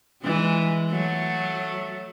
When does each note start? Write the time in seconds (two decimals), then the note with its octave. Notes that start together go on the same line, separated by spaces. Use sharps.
0.24 E3 G#3
0.91 F#3 A3